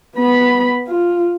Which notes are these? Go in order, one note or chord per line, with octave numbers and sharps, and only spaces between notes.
B3 B5
F4